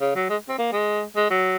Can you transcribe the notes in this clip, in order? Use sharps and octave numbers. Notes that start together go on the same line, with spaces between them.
C#3
F#3
G#3
C4
A#3
G#3
G#3
F#3